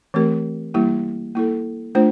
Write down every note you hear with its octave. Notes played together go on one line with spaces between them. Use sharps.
E3 A3 C4 G4 A#4
E3 G3 A#3 E4 G4
A#3 E4 A4
A3 D4 F4 C5